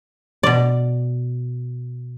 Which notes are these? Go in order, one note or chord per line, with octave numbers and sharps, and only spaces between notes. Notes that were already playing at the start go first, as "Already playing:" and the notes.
B2 D5